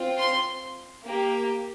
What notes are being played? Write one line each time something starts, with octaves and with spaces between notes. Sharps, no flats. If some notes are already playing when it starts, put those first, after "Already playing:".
Already playing: C4 F4
C6
A#3 G4